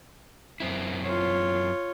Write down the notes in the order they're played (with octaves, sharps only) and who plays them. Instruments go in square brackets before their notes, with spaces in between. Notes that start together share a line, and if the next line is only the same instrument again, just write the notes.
[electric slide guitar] F#2 C4 E4
[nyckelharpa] F4 C#5